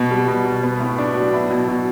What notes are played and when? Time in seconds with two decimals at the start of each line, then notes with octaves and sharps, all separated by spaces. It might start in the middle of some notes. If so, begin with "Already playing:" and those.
Already playing: B2
0.11 G3
0.28 B2
0.46 B2
0.63 B3
0.80 A2
0.98 D4
1.15 F#3
1.33 E4
1.50 B2
1.68 B2